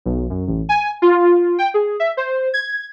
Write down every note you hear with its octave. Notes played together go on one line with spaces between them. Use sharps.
B1
F#2
A1
G#5
F4
G5
G#4
E5
C5
G#6